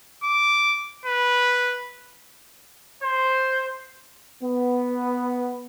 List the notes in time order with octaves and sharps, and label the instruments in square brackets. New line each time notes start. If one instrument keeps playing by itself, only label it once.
[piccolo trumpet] D6
B4
[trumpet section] C5
[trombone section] B3